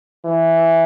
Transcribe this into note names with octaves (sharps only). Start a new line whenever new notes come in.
E3